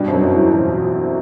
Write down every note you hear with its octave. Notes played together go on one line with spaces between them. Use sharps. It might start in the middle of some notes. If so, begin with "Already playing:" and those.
Already playing: G2 B2 G3
F#2 F#3 C4
C4
E2 E3
F#3
E2 B2 E3
B2
B2
A3